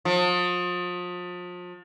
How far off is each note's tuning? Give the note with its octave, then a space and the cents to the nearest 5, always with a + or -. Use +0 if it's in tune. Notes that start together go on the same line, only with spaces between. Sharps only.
F3 +35